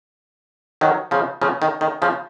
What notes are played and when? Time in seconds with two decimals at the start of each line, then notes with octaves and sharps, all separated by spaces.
0.81 D#3 F#3
1.11 C#3 F3
1.41 C#3 F3
1.62 D#3
1.81 D#3
2.02 C#3 F3